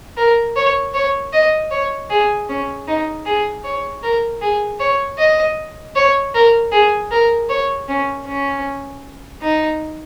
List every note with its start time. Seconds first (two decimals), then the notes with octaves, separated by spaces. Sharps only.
0.17 A#4
0.56 C#5
0.94 C#5
1.33 D#5
1.71 C#5
2.10 G#4
2.49 C#4
2.88 D#4
3.26 G#4
3.64 C#5
4.03 A#4
4.42 G#4
4.80 C#5
5.18 D#5
5.96 C#5
6.35 A#4
6.72 G#4
7.11 A#4
7.49 C#5
7.89 C#4
8.27 C#4
9.42 D#4